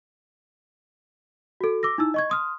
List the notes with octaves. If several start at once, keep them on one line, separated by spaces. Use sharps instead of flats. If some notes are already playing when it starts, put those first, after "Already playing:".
F#4 A4
D6 E6 A#6
D#4 E4 E6
D#5 C#6 G#6
C6 D#6 F6